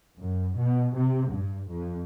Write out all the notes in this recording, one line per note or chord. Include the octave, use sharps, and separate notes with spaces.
F#2
B2
C3
G2
F2